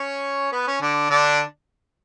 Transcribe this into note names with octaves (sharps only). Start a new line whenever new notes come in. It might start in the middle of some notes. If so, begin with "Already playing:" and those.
Already playing: C#4 C#5
B3 B4
C#4
D3 D4
D3 D4